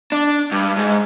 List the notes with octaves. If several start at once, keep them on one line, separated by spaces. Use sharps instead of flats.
D4
G2
G#2